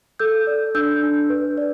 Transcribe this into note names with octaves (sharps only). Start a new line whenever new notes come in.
A4 E6 G6
D5
D4 E6 G6
D4
B4
D5